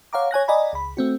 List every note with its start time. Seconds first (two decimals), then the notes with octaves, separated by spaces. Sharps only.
0.13 C#5 F5 F#5 A#5 D6
0.31 C#5 G#5 F#6 A#6
0.48 D5 D#5 F#5 G#5 A#5 B5
0.73 C#2 B5
0.97 A3 C4 F#4